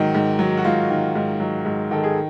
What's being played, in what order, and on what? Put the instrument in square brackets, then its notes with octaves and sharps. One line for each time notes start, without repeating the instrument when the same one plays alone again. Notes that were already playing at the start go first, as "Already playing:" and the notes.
Already playing: [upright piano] G#2 D#3 F#3 F#4
G#2
F#3
F#4
G#2 F4
D#3
G#2
F#3
G#2
D#3 A4
G#4